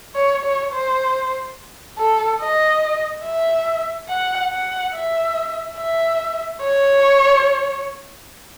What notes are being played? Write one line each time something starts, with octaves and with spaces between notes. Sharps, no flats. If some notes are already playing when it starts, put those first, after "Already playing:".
C#5
C#5
C5
A4
D#5
E5
F#5
F#5
E5
E5
C#5